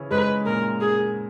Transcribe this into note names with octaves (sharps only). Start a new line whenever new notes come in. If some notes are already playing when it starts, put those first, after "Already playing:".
Already playing: C#3 E3 C#4 E4
G#2 G#3 B4
A#2 A#3 A#4
G#4